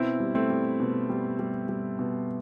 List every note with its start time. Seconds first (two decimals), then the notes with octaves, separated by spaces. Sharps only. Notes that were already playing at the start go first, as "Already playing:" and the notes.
Already playing: B2 C4 E4
0.20 G3
0.35 A3 C4
0.50 G3
0.80 B2
1.10 G3
1.39 G3
1.69 G3
1.99 B2